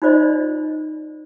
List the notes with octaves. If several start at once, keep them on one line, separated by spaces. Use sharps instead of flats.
D#4 F4 C5 D5 D#5